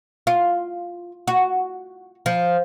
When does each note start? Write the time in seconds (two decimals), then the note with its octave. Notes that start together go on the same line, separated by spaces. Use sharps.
0.27 F4
1.27 F#4
2.26 F3